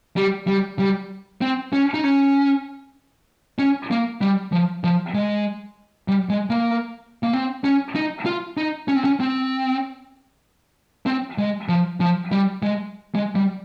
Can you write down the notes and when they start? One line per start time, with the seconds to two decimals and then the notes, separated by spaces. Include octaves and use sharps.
0.16 G3
0.47 G3
0.79 G3
1.41 C4
1.73 C#4
1.94 D#4
2.04 C#4
3.59 C#4
3.91 A#3
4.21 G3
4.52 F3
4.84 F3
5.14 G#3
6.08 G3
6.29 G#3
6.50 A#3
7.23 A#3
7.33 C4
7.64 C#4
7.95 D#4
8.26 F4
8.57 D#4
8.88 C#4
8.96 C4
9.04 C#4
9.20 C4
11.06 C4
11.38 G#3
11.69 F3
12.00 F3
12.31 G3
12.62 G#3
13.15 G#3
13.35 G3